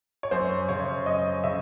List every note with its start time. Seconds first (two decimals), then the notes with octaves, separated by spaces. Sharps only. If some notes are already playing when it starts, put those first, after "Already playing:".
0.23 C#5
0.31 F#2 C5
0.69 C#3 C#5
1.06 F#2 D#5
1.44 C#3 E5